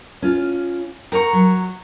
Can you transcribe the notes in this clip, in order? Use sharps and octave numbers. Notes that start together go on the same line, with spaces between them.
C#4 F4
A#4 F#5 A#5 C#6
F#3